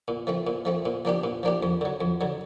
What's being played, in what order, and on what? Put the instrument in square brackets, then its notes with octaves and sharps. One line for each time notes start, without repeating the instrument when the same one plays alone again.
[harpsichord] A#2
F3 A3 C4
A#2
F3 A3 C4
A#2
F3 A#3 D4 G4
A#2
F3 A#3 D4 G4
F2
D3 F#3
F2
D3 F#3